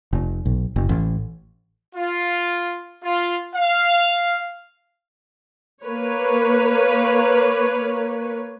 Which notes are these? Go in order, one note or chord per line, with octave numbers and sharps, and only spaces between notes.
F1
B1
F#1
A1
F4
F4
F5
A#3 B4 C#5